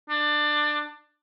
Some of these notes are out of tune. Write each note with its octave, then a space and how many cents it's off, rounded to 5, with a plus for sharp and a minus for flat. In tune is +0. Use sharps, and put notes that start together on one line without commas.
D4 +20